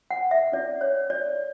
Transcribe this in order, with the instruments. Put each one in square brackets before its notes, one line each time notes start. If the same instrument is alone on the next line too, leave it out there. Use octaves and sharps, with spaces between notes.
[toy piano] F#5
E5
C#4 E4 A4 D5
C#5
D5